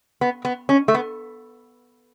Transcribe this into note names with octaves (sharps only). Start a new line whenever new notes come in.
B3
B3
C#4
A3
B3